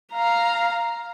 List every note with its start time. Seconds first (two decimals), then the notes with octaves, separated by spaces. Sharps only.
0.13 F5 A#5